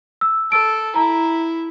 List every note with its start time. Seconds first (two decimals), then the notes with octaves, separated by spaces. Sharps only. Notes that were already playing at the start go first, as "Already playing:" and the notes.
0.21 E6
0.52 A4 E6 D7
0.96 E4 A#5